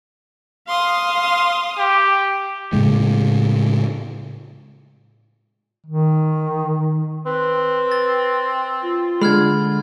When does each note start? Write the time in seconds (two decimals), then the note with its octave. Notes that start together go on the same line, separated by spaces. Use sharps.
0.68 F5 C6 D#6
1.78 G4
2.73 A2 C#3 G#3
5.86 D#3
7.26 C4 B4
7.92 A6
8.83 F4
9.21 D3 G#3 B5 F6 G#6